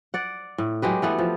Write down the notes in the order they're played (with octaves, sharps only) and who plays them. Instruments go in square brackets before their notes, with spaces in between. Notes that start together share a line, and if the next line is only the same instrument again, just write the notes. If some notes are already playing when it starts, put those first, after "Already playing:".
[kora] D5 F#5
A2
F#3 G#3 G4 B4
E3 A3 B3
F3